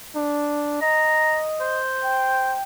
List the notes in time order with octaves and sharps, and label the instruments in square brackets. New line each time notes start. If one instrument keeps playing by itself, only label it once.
[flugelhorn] D4
[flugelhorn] D#5 [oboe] A#5
[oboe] C5
[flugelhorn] G5